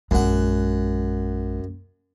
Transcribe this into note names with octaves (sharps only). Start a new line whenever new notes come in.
A#1 F#2 G#3 F#5